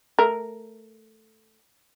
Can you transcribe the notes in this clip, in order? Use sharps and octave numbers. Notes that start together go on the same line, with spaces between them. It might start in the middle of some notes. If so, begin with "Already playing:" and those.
A3 A#4